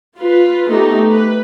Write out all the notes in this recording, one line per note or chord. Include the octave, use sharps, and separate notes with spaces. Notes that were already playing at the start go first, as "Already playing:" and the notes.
F4 B4
A3 B3 D#4 G4
B4